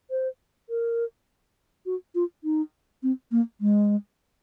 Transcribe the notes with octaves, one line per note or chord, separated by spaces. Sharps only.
C5
A#4
F#4
F4
D#4
C4
A#3
G#3